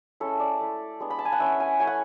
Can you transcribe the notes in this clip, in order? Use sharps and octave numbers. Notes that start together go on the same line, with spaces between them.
G#3 C#4 E4 A4
D5
A3 E4
G#3 B3 D4
B5
A5
G#5
F#5
A3 C#4 E4 E5
G#5
A3 C#4 E4 G#5
F#5